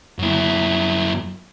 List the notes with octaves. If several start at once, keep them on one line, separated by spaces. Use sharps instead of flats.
F#2 E4